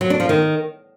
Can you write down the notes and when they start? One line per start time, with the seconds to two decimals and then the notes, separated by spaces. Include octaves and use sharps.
0.01 F#3
0.10 D4
0.20 F3
0.29 D#3